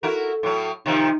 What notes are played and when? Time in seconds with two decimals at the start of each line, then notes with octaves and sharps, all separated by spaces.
0.03 E4 F#4 A4 A#4
0.43 A2 F#3
0.86 C3 D#3 F3 D#4